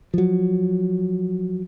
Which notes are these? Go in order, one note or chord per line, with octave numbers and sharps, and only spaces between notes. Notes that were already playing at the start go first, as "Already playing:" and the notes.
F3 F#3